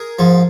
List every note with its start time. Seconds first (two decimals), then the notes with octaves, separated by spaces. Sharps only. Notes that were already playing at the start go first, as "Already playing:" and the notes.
Already playing: G#4 A#4
0.19 G#2 F3